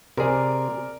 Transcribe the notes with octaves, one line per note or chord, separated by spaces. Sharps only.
C3 G#4 A#4 D5